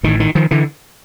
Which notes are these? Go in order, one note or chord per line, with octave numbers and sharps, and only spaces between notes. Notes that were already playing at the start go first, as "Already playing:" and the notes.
A1 A2 D#3
D#3
D#3 F3
D3 E3